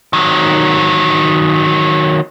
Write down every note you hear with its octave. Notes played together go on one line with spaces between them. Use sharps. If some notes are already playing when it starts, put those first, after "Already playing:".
D#3 F#3